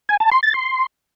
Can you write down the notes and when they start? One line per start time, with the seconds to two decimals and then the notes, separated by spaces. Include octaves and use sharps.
0.09 G#5
0.20 A5
0.32 C6
0.43 A6
0.54 C6